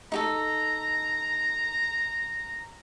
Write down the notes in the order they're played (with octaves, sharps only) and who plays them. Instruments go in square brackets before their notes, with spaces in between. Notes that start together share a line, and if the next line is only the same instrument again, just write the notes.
[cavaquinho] D#4 G4 A4 [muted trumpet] A#5